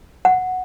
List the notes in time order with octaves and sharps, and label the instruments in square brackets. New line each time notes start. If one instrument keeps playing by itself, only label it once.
[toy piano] F#5